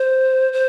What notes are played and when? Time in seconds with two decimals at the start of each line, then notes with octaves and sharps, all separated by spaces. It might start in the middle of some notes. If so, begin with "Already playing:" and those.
Already playing: C5
0.53 C5